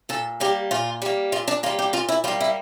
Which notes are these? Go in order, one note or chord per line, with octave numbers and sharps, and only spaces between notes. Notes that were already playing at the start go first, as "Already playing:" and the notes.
A#2 A4
G3 A#3 G4
A#2 F4
G3 A#3
A#2 F4
D4
G3 A#3 F4
G4
A#2 F4
E4
G3 A#3 F4
E4